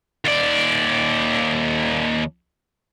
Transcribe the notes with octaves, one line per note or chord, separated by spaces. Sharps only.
D#2 D5